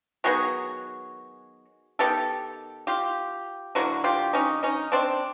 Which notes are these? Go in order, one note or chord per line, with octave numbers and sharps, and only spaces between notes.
D#3 F#3 B3 F#4 G#4
D#3 F#3 B3 G4 A4
F4 G4
D3 F#3 A#3 E4 F#4
F4 G4
C#4 D#4
C#4 D#4
C4 D4